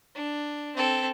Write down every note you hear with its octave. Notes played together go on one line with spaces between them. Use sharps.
D4
C4 A4